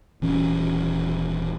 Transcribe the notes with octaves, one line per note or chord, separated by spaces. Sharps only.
D#1 E3 C#4